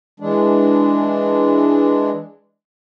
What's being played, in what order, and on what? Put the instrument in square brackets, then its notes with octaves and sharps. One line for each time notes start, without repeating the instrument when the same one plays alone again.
[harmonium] E3 G#3 D4